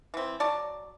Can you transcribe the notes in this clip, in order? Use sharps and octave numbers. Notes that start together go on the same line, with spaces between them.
E3 C4
F#3 D5 A5